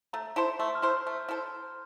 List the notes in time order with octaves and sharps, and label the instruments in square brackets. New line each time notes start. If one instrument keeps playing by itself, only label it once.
[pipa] A3 [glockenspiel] A#5
[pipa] E4 A4 C5
[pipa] A3 [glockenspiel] C6
[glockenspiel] F6
[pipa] E4 A4 C5
[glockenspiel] G6
[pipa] A3
E4 A4 C5